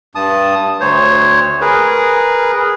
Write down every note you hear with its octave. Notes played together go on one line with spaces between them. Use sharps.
G2 A5 D#6
D2 C5 C#5
G#4 A#4 B4